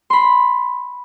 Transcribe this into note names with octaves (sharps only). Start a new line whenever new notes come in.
B5 C6